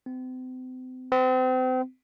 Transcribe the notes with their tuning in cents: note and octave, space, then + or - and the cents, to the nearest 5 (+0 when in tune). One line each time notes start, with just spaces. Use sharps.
C4 -40
C4 -35